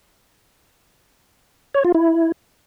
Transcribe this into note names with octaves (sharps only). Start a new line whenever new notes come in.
C#5
F4
E4